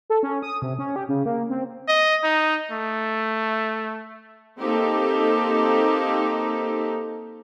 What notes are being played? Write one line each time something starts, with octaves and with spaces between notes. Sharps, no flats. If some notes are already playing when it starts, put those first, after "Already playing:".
A4
C#4
D#6
C3
C#4
G4
C#3
A#3
C4
D#5
D#4
A3
A#3 C4 D#4 G4 A4